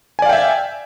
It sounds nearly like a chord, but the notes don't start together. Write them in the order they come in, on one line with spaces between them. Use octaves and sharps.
G#5 D5 F5 G5 E5